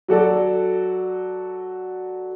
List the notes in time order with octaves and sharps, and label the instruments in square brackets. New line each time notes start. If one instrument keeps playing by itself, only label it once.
[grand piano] F#3 F#4 A4 D5